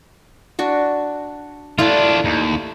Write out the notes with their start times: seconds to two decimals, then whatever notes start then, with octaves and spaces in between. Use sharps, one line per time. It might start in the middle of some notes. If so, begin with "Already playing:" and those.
0.59 D4 F#4 C#6
1.78 A3 D4 E4 F4 D5
2.25 D#2